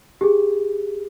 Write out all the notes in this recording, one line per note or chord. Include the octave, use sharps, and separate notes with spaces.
G4 G#4